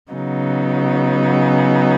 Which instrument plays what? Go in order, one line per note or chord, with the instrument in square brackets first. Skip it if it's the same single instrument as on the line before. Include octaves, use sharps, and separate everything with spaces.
[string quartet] C#3 F#3 B3 D#4